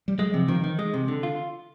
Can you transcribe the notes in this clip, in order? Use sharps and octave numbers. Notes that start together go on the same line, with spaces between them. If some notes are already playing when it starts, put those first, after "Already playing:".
G3
F#3 G#3
C3 F3
D#3 F3
D#3 E3
G#3
C3
D3
F4